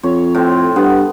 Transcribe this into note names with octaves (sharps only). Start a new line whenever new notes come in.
F2 C#5
A2 C4
G2 B3